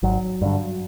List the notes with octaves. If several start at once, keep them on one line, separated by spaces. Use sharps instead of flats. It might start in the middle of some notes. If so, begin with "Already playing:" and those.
G#1 F#3
G2 D3